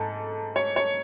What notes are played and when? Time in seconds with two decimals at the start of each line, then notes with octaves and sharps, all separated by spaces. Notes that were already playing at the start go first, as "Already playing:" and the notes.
Already playing: G#2 A4
0.56 C#5
0.76 C#5